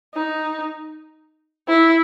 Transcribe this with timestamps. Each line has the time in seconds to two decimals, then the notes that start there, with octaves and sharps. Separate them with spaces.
0.14 D#4
1.68 E4